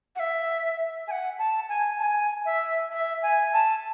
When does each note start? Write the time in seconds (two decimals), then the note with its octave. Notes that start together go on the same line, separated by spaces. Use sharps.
0.16 F#5
0.19 E5
1.08 G#5
1.11 F#5
1.39 A5
1.69 G#5
1.99 A5
2.03 G#5
2.45 E5
2.92 E5
3.23 G#5
3.53 A5